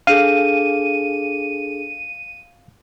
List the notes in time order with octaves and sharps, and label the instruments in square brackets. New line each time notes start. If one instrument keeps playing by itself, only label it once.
[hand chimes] D4 G#4 A4 [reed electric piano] F5 [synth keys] D#7